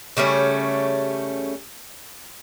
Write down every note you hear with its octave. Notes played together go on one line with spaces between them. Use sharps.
C#3 G3 A3 C#4